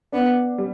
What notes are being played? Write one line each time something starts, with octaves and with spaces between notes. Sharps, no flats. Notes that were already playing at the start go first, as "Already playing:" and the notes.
B3 D4
G3